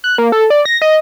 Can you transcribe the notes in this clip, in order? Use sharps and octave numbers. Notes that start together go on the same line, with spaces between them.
F#6
A#3
A4
D5
A#6
D#5